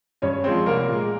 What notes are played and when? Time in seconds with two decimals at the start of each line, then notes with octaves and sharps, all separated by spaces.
0.22 G2 C#4 C#5
0.44 F3 G#3 C4
0.66 C2 A#3 A#4
0.89 A#2 G#3